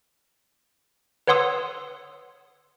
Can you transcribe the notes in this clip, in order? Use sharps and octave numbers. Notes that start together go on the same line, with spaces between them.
B4 C#5 F#5 C6 D#6 E6